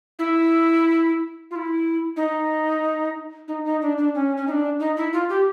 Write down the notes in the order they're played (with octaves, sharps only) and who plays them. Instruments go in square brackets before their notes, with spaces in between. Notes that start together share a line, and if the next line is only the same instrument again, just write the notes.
[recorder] E4
F4
E4
D#4
D#4
D#4
D4
D4
C#4
C#4
D#4
D4
D#4
E4
F4
G4